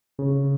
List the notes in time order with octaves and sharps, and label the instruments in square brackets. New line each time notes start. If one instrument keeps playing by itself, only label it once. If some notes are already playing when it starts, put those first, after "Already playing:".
[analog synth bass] C#3